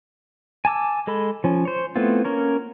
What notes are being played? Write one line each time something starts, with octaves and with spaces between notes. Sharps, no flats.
G#5 A5 D6 E6
G#3 A4 B5
F3 C#4
C5 C#5
A3 B3 C4 E4 F4
A#3 C#4 A#4 C#5